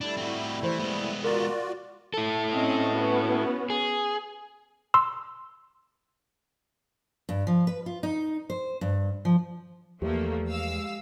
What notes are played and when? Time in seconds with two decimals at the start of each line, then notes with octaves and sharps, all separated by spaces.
0.01 G3 A3 D4 E4
0.17 C4 F#4
0.63 E3 C5
0.79 G#3 B3
1.24 F4 F#4 A#4 D5
2.14 E4 A4
2.52 C4 C#4 D#5
2.93 B3 C#4 F#4
3.70 G#4
4.94 C6 E6
7.29 G2
7.47 F3
7.67 B4
7.86 F4
8.03 D#4
8.50 C5
8.81 G2
9.25 F3
10.02 E2 F3 A3 A#3 G4
10.49 G#3 F5 E6